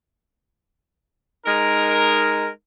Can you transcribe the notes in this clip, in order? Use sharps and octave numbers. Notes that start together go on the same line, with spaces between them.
G#3 D#4 A#4